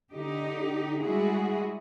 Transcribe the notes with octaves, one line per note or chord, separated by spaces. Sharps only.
D3 D#4 G4
G3 G#3 E4 F#4 G#4